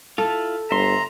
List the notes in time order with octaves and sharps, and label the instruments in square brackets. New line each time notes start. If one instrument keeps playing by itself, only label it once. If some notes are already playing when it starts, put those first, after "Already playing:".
[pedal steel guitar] E4 F4 [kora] A4
[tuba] G1 [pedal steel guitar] E5 C6 [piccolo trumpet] A#5